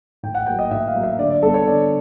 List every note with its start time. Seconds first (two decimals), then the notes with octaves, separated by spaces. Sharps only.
0.23 A2 G5
0.35 F#5
0.46 F#3 A#3 G5
0.59 D#5
0.71 A2 E5
0.88 F5
0.95 F#3 A#3
1.03 E5
1.18 D3 D5
1.30 D5
1.43 G3 A4
1.46 B3
1.54 C#5
1.66 D3 D5